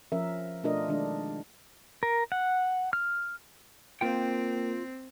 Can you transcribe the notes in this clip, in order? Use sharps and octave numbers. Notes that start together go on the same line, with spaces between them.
F3 C#4 A#4 E5
B2 A3 D4 F4 A#4 D#5
D#3 G#3 D4
A#4
F#5
F6
A#3 C4 F4 G5